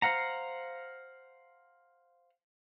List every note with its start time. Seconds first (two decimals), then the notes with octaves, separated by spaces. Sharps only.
0.02 C5 F5 F#5 A#5